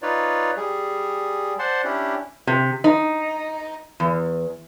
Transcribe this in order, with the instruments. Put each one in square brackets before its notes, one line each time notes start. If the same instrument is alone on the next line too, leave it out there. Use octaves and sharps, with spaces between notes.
[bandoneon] D#4 F4 B4 C#5 D5
G3 G#4
C5 D5 F#5 A5 C6
C#4 D4 E4 G4
[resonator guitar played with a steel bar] C3
D#4
E2